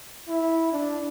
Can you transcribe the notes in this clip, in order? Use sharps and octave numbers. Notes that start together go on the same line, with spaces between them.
E4
D4